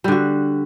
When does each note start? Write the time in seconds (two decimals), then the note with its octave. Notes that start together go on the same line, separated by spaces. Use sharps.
0.04 G3
0.08 D3
0.12 F#4